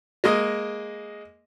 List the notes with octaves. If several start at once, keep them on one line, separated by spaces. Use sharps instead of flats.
G#3 A#3 D#5